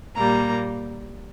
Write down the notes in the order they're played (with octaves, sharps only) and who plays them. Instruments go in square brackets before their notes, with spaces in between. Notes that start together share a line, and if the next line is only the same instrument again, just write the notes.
[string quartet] A#2 G3 A#3 A#5